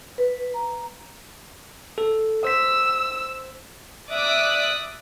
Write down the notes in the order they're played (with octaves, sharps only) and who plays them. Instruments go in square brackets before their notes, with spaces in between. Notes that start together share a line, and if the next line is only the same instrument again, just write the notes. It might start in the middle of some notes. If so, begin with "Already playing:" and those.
[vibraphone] B4
A#5
[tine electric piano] A4
[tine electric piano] C5 B6 [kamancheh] E6
[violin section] D5 E5 D6 D#6 F#6